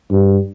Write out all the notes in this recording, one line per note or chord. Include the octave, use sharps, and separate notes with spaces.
G2